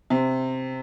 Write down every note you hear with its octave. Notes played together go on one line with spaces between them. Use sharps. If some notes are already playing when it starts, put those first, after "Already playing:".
C3